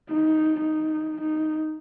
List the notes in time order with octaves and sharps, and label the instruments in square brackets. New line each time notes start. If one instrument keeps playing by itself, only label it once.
[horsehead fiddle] D#4
D#4
D#4